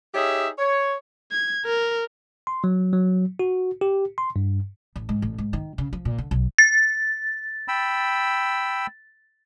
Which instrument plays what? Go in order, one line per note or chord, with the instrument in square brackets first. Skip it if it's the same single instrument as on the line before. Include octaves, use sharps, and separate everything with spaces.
[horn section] D#4 G4 G#4 C#5 E5
C#5
[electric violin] G#6
A#4
[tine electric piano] C6
F#3
F#3
F#4
G4
C6
G2
[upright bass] A1
G#2
A1
G#2
D#3
C#3
F3
A#2
D3
B1
[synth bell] A6
[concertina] G5 B5 E6